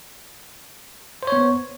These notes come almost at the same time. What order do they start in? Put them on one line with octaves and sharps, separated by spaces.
C5 C#5 B3